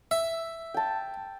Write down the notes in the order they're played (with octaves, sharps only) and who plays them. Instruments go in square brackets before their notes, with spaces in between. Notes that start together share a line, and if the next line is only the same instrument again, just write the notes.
[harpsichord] E5
[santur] G5 A5